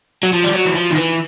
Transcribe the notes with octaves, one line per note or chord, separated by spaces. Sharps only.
F#3
F3
G3
F#3
E3
F3
D#3
E3